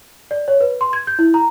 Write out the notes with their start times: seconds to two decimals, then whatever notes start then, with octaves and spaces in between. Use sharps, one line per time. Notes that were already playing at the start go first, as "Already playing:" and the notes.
0.31 D5
0.48 C#5
0.61 B4
0.81 C6
0.93 G#6
1.07 G6
1.19 E4
1.34 A#5